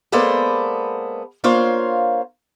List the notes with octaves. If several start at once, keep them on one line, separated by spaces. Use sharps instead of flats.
G#3 A#3 B3 A4 C5 D5
A#3 D4 F4 C5 C#5 F5